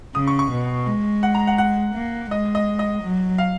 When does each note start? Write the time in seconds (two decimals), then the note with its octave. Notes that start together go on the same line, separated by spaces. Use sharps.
0.15 C#3 D#6
0.27 C#6
0.39 C#6
0.52 B2
0.87 G#3
1.23 F#5
1.35 A#5
1.47 F#5
1.58 F#5
1.95 A#3
2.31 G#3 D#5
2.55 D#5
2.79 D#5
3.02 F#3
3.38 F5